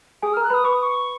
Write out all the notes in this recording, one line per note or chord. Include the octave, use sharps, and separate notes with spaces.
G#4 G#5 D#6
F6
A#4 A#5
F#6
B4 B5 D#6
B4 B5 C#6
D#6
C#6